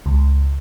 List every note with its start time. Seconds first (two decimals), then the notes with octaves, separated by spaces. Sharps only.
0.06 C#2